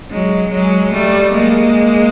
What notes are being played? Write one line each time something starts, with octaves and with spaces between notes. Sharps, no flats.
F#3 G#3
F#3 G#3
G3 A3
G#3 A#3